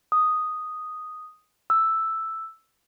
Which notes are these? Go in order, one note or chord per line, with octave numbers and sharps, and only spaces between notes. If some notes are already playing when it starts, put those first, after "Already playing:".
D#6
E6